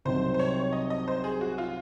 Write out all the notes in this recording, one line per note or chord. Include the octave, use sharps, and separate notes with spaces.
C2 C3 F#3 C4 D#4 C5
C5
C#5
D#5
D#5
C5
G#4
F#4
F4